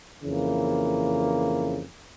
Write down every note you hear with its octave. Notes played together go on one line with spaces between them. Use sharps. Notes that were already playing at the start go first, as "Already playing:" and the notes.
F2 C#3 E3 A#3